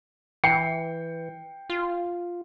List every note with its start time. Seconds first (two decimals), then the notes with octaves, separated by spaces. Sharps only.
0.44 E3 G5 C7 C#7
1.70 F4